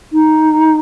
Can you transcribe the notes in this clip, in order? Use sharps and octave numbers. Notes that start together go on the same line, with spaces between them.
D#4